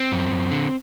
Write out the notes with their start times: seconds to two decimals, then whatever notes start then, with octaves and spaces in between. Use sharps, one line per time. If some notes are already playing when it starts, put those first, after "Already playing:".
Already playing: C4
0.12 F#2
0.31 F#2
0.51 D3